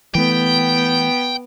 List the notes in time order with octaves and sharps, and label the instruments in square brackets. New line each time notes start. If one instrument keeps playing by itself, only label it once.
[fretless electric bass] E3 A3 [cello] B3 [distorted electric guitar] G5